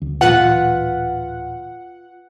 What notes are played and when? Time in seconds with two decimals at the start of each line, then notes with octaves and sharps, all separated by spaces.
0.02 D2
0.21 D1 A#2 E3 F4 B4 F#5